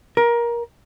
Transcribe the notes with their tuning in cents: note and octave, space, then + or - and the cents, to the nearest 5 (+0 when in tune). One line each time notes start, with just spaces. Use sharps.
A#4 +20